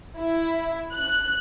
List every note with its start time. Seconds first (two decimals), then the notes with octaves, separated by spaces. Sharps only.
0.18 E4
0.94 F#6